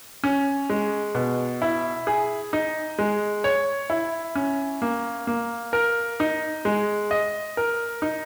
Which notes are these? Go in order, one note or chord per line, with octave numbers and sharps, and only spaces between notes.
C#4
G#3
B2
E4
G#4
D#4
G#3
C#5
E4
C#4
A#3
A#3
A#4
D#4
G#3
D#5
A#4
D#4